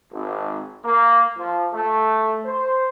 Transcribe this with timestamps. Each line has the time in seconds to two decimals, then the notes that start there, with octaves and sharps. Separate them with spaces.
0.12 G#1
0.85 A#3
1.38 F3
1.73 A3
2.44 C5